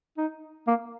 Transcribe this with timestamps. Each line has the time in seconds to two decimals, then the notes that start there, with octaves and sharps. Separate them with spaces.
0.18 D#4
0.68 A#3